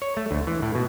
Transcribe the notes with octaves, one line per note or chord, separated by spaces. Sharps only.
C#5
A3
D2
E3
A2
B2